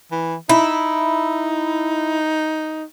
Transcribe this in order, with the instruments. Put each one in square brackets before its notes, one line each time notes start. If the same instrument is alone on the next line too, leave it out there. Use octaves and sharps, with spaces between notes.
[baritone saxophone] E3
[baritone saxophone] D#4 [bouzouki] E4